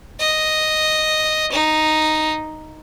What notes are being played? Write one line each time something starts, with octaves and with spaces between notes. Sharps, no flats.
D#5
D#4